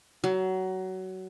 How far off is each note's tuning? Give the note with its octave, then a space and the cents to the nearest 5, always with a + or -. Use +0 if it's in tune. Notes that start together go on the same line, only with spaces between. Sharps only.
F#3 +20